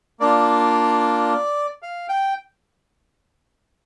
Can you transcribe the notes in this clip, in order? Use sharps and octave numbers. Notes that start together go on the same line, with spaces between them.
A#3 D4 F4 D5
F5
G5